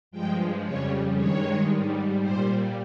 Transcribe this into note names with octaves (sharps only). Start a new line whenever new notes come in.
G2 F3 G#3 G5
F2 C#3 G3 C#5
G2 D#3 G#3 C#5
G#2 G3
A#2 G3 C5